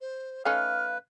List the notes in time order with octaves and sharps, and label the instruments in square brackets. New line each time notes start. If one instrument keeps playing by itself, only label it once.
[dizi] C5
[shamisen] A3 C#4 D#4 [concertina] B4 [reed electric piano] F5 [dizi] F6